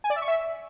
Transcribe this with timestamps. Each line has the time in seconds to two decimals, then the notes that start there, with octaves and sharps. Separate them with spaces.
0.04 G#5
0.10 D5
0.16 E5
0.22 C#6
0.28 E5